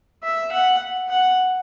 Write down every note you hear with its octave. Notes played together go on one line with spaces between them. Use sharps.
E5
F#5
F#5